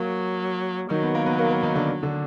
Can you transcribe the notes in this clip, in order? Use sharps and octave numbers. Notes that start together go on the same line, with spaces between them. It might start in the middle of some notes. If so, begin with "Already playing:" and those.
Already playing: F#3 A#3 A#4
D#3 F#3 D#4
B3
A#3 A#4
B3 B4
A#3 A#4
A#3 A#4
D#3 D#4
D3 D4
D3 D4